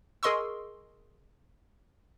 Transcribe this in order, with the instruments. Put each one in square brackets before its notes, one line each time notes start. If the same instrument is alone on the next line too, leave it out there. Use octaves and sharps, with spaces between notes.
[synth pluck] G#4 A#4 D#5 C6 C#6 E6